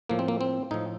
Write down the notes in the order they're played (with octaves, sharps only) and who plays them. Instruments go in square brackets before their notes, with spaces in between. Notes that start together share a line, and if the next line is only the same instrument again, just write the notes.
[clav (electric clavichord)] A2 F3 A#3
C4
A#3
C4
A2 F3 D#4